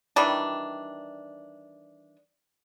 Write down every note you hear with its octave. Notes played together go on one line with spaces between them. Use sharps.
D#3 E3 G3 D4